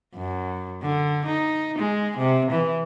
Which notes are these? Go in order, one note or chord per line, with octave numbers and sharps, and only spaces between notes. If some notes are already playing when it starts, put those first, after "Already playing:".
F#2
D3
D#4
G#3
C3
E3